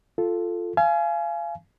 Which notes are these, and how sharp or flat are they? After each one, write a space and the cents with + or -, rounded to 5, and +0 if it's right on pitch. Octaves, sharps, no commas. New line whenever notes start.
F4 +0 A4 +0
F5 -30 G#5 +25